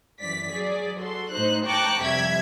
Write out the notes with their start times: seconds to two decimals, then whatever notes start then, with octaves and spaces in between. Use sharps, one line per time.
0.22 F#2 E3 D5 B6
0.53 F#3 G#4 D5
1.00 F#4 A4 C6
1.31 A2 D#4 C5 F#6
1.66 G5 A5 A#5 C#6 D6 F#6
2.03 F2 C3 G3 E5 G#6 B6